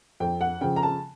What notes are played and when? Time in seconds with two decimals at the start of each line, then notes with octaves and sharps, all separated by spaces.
0.20 F2 G5
0.41 F#5
0.61 C#3 F3 G5
0.76 A#5
0.83 A5